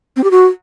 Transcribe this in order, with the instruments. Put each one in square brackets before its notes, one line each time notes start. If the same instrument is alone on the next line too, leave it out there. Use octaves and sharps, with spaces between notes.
[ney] C4
G4
F#4